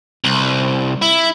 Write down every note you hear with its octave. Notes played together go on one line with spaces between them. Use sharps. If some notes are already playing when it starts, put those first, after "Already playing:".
C2
E4